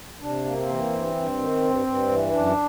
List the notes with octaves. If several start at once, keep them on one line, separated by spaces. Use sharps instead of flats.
C3 D4
A#3
C4
E3
G2
G2
D#3
G2
G2
E3
F#2 D4